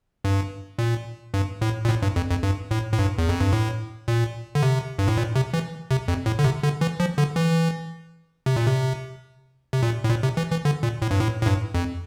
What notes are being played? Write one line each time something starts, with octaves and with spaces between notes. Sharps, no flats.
G2
A#2
G2
A2
A#2
A2
G2
F2
F2
G2
A2
A2
G2
E2
F2
G2
A2
A#2
D3
C3
G2
A2
A#2
C3
E3
C3
F2
A2
D3
C3
D3
E3
F3
D3
E3
C3
A#2
C3
C3
A#2
A2
A#2
C3
E3
E3
D3
A#2
A2
G2
A2
A2
G2
F2